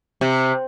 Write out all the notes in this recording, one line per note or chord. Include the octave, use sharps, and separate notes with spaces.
C3